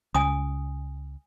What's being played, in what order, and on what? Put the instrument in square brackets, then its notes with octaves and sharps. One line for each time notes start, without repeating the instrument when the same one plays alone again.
[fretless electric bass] C#2 [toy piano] G#5 D#6